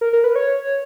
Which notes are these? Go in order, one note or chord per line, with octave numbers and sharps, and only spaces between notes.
A#4
A#4
B4
C#5